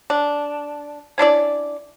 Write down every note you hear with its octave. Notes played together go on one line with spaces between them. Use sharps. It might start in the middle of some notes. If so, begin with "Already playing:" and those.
D4
C#4 D4 E4 D5